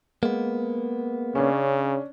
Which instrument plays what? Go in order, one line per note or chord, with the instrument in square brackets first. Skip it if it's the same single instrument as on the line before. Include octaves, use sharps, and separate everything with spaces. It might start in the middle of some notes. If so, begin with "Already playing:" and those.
[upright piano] G#3 [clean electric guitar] A#3 B3
[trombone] C#3 [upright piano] C#4 D4